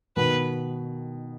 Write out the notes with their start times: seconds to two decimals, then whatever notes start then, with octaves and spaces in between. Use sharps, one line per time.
0.17 B2 D#3 B4